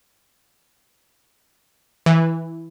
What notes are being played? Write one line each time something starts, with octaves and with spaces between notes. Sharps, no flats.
E3